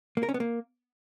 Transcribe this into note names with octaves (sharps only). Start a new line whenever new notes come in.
A#3
A#4
C#4
B3
A#3